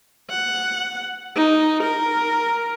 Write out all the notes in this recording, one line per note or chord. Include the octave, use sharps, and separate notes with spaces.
F#5
D#4
A#4